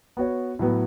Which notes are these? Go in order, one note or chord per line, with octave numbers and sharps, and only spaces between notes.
B3 F#4 C#5
A2 F#3 B3